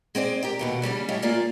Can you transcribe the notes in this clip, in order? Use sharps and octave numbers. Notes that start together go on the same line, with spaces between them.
G#3 C4 C5 D5
G4 A#4 G5
D#2 B2 D3
C#3 G3 C#4 D4
A2 G3 G#3 C#5 E5 F5
A#3 F4 G#4 D5 F5